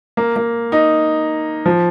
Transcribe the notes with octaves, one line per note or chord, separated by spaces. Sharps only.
A#3
A#3
D#4
F3